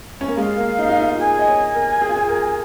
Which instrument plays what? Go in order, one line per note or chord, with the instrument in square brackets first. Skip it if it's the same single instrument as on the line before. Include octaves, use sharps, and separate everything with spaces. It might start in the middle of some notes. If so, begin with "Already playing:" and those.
[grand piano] C#4
A#3
[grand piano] G#3 [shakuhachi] F5
[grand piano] A#3
D#4
D#4
F4
[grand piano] G#4 [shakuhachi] G#5
[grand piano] D#5
C#5
A#4
G#4
F4
G#4
A#4